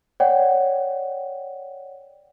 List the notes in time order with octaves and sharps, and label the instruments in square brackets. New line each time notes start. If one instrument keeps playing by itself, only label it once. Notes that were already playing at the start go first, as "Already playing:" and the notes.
[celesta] C#5 D5 F#5 G5